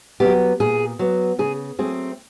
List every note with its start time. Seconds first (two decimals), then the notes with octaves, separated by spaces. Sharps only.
0.20 F#3 B3 G4
0.60 A#2 G#4
0.99 F#3 B3
1.39 C#3 G#4
1.79 F#3 A3 C4 G#4